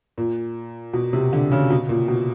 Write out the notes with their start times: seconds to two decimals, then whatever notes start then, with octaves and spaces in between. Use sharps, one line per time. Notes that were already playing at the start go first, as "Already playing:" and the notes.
0.18 A#2
0.93 B2
1.13 C3
1.33 D3
1.51 C#3
1.70 B2
1.89 A#2
2.08 B2